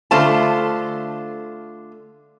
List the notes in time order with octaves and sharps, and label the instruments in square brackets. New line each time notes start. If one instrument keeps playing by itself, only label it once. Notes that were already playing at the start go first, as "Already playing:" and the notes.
[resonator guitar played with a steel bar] D3 A3 F4 C5 A5